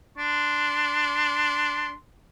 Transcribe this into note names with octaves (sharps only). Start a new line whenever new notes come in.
D4 C6